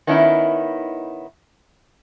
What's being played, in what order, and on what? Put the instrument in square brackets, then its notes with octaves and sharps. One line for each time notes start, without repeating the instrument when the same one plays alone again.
[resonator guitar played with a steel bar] D#3 B3 C#4 D#4 E4